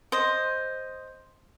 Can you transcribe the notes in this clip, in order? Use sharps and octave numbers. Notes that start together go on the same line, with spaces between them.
C5 D#5